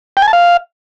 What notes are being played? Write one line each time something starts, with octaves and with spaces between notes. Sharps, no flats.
G5
G#5
A5
F5